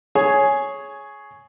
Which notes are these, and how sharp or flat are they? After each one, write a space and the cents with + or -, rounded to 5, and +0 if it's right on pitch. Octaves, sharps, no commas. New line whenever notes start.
G#4 +10 C#5 +0